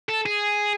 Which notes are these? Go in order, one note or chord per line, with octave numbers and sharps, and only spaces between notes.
A4
G#4